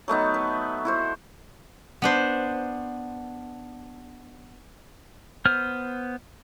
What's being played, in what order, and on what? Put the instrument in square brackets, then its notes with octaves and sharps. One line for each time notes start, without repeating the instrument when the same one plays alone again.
[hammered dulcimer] F#3 A3 B3 D#4
B4
E4 F#4 C5
[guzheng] B3 D4 C5
[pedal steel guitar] B3 C5 F6